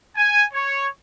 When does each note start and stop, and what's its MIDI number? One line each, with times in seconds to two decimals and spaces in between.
0.17 0.45 80
0.53 0.88 73